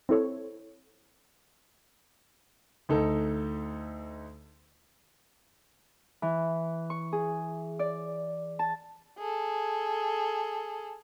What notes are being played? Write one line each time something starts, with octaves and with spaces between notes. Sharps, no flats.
C4 E4 A4 C#5
D2 D#4 A4
E3
C#6
G#4
D5
A5
G#4 A4